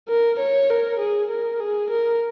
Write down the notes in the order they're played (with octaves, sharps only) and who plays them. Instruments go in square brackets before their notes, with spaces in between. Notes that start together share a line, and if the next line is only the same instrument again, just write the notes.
[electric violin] A#4
C#5
A#4
G#4
A#4
G#4
A#4